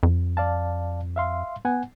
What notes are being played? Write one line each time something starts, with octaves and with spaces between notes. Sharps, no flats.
F2
D5 F5 A5
E5 F5 C6
B3 F#5 G#5